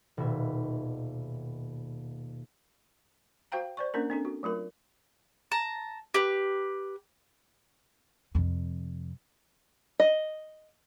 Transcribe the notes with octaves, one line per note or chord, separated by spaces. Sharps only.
D#1 B2 D#3 E5
F#4 C5 F5 G5 A#5
C5 D5 C#6
A#3 C#4 D4 A#4
C4 D4 A4
F#4
F#3 A3 F4 A#4
A5 A#5
G4 B4
F2 C3
D#5